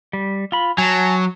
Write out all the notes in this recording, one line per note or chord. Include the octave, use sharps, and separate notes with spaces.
G3
F4 B5
F#3 G#5 A5